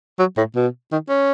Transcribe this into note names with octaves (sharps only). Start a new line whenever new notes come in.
F#3
A2
B2
D#3
C#4